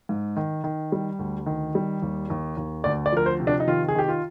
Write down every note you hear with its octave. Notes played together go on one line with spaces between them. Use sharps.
G#2
D#3
D#3
G3
D2
D#3
G3
D#2
D#2
D#2
D2 D5
D5
F3 A#4
C5
C3
D4
D#4
D#3 F4
G#4
D#3 G4
F4